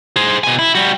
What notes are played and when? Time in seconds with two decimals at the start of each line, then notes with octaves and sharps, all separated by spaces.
0.16 G#4 C5
0.44 B2 G#5
0.59 E4
0.75 G3 F#4